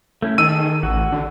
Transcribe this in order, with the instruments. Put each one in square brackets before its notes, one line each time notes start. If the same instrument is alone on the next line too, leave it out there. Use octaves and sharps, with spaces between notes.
[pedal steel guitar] A3 C#4 E4
[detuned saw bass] D#3 [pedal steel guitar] G#4 A4 [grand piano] E6 D#7
[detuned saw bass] A1 [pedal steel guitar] F#4
[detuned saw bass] D3